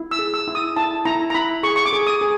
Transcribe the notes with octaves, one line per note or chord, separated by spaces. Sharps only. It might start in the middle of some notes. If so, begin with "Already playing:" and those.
Already playing: E4
E6
G#4
E6
E4
D#6
E4 A5
E4 A#5
A#5
E4 B5
G#4 C#6
C#6
D6
G#4
D#6
G#4